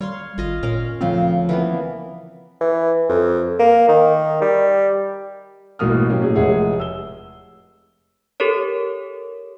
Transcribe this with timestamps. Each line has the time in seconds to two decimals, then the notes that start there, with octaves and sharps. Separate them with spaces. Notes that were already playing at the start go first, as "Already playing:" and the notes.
0.01 G3 C#5 F5 C6
0.38 G#1 F4 D#5 F5
0.63 A#2 C#4 A#4 F5
1.01 D2 C#3 F3 C4
1.49 E3 A#3 B3
2.61 E3
3.09 F2
3.60 A#3
3.88 D#3
4.41 G3
5.79 A1 G#2 B2 A#3 D#6 F6
6.09 F#3 A#3 C#4 G4
6.22 A2 G#4
6.35 F1 G#3 G#4 C#5 E5 F#5
6.80 E6 G7
8.40 G4 A4 A#4 C#5